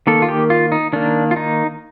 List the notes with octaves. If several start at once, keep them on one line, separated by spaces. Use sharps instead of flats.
D#3 A#3 A4
F4
G4
F4
D#4
D#3 A#3 D4
F4
D#4